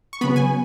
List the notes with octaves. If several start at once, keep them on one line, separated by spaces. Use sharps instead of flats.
C#6
C#3 F#3 B3 B5
G#5